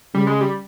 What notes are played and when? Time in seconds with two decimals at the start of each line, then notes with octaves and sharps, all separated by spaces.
0.14 C#3 G3
0.27 G#3
0.41 G3